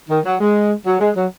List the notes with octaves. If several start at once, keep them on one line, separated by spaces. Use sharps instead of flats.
D#3
F#3
G#3
F#3
G#3
F#3